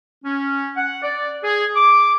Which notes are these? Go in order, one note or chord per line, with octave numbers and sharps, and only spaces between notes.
C#4
F#5
D5
G#4
D6